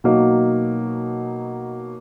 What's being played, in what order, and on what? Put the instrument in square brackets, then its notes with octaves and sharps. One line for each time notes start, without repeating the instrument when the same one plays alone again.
[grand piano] B2 F#3 A#3 D#4